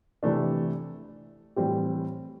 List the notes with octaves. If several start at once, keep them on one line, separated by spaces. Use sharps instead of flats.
C3 E3 A3 D4
A2 E3 G3 C4 G4